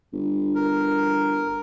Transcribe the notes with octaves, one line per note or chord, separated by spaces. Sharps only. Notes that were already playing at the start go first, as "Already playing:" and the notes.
G1
A#4